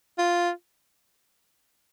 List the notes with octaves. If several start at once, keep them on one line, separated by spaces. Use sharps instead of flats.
F4